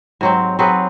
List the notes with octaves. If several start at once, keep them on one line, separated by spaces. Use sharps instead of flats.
G#2 F#3 C4
F#3 C4 G#4 B4